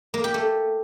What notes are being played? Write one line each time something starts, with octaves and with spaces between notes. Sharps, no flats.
A#3
G4
A3